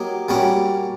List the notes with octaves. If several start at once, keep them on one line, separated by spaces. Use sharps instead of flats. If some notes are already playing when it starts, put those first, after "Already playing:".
Already playing: F#3 A#3 D#4 G4
G3 A#3 C#4 F#4